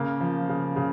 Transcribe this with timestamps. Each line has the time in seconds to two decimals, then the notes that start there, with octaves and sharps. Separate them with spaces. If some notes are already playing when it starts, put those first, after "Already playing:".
Already playing: C#3 A#3
0.21 F3
0.49 C#3
0.76 C#3